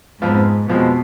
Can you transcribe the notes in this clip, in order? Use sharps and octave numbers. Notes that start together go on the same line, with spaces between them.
F2 G#2 F3 B3 F4
F2 B2 F3 G#3 B3